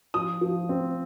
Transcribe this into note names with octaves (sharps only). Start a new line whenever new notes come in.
F3 D#6
F3
C4